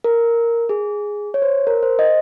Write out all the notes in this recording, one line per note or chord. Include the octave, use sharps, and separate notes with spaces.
A#4
G#4
C#5
C5
A#4
C5
D#5